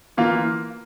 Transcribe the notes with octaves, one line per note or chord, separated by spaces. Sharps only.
E3 A#3 F4